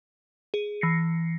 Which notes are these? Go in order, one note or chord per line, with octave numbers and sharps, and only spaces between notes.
G#4
E3 A#6 C7 C#7